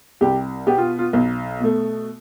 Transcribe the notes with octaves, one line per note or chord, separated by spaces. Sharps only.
C2 G4
B2 B3 G4
F4
F4
B1
B2 A3